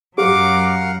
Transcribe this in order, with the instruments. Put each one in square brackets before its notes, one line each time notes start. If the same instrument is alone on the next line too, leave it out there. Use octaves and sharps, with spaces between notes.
[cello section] F#2 F#3 [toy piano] G4 [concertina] A#4 F5 F#5 [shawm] D6